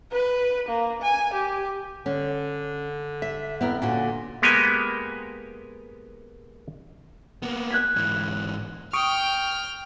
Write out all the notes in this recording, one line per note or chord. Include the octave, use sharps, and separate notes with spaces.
B4
A#3
G#5
G4
D3 C#4
E5
F2 B3 E4 A#4
A#2 D3 C#4 F#4
G#3 A#3 B3 G4 D#5 G#5
A#3 B3
F#6 G#6 B6
G#2 E3
G5 C#6 D#6 F6 D7